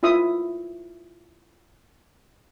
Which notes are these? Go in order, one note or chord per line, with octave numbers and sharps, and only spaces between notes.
E4 F4 E5 D#6